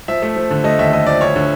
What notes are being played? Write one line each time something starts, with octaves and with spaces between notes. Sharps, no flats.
F3 E5
A3
F3
D3
A3 D#5
D#2 E5
A3 D#5
F3 D5
D2 C#5
D3